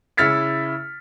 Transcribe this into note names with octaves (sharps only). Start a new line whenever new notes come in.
C#3 E4 F6 A6 B6 C#7